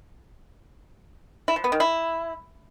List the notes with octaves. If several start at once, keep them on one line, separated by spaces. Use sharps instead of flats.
E4
F3
B3
D#3
E4